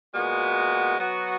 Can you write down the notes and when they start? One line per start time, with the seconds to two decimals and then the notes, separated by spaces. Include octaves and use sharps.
0.15 A#2 G#3 B3 F#4
0.98 F#3 B3 F#4